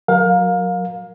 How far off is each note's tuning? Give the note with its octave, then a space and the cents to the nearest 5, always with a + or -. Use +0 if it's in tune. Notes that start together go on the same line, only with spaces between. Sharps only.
F#3 -15 A#4 +0 F5 +25